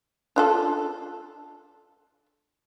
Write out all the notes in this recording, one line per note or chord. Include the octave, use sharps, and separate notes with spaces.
D4 F4 A4